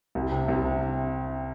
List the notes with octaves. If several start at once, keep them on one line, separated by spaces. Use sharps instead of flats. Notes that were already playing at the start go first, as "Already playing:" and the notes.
C2
C3
C2
C3